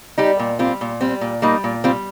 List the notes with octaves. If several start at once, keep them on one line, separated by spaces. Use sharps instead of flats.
G3 D#4 G4
A#2
G3 C4 F4
A#2
G3 C4
A#2
G3 A#3 D#4
A#2
G3 C4 F4